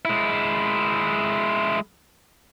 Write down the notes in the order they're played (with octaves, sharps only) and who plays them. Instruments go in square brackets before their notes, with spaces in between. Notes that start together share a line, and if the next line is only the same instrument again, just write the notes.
[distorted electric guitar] G#3 E4